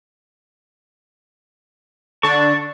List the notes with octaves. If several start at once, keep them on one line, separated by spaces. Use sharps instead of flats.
D3 D4 A5 C#6